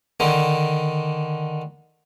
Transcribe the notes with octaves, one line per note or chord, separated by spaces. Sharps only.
D3 D#3